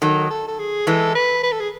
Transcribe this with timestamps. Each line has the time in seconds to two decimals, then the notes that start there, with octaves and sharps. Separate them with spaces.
0.02 D#3 F#3 A4
0.30 A4
0.48 A4
0.59 G#4
0.87 E3 G#3 A4
1.15 B4
1.43 B4
1.52 A4
1.60 G#4